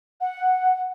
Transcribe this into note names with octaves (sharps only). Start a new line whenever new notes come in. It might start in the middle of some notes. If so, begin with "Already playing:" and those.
F#5